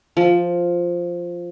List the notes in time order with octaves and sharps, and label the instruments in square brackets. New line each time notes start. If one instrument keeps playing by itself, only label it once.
[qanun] F3